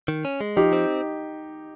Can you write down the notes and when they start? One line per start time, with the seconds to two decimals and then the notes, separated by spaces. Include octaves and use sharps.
0.08 D#3
0.25 C#4
0.41 G#3
0.56 F3 D#4 G4
0.73 C4